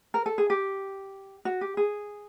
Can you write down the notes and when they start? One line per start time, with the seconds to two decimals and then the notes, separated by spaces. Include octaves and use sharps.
0.14 A#4
0.26 A4
0.38 G#4
0.50 G4
1.45 F#4
1.61 G4
1.77 G#4